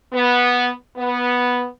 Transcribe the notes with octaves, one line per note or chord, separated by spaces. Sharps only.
B3
B3